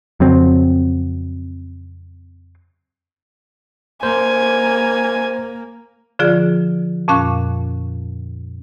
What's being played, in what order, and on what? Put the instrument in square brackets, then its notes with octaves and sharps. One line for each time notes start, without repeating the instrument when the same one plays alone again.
[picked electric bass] F2 C#3 F#3 C4
[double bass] A#3 [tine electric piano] C5 [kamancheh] G#5
[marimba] D3 F3 F4 G#4 D5
F2 A#2 C#4 F5 C#6 F#6